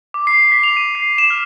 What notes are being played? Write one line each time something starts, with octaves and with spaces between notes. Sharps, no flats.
D6
C7
B6
F7
D#7
C7
E7
F6